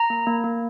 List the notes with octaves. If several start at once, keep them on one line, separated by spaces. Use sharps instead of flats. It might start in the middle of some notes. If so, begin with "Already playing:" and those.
Already playing: A#5
A#3
A#3
A#3